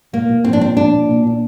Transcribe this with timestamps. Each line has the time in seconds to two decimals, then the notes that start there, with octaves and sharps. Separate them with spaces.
0.13 A#2 A#3
0.29 A#2
0.44 F3 C4
0.53 D4
0.61 A#2 C4
0.77 F3 D4
0.94 A#2
1.09 A#2
1.25 A#2